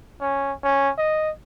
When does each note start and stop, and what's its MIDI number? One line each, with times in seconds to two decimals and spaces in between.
0.21 0.52 61
0.64 0.90 61
0.98 1.30 75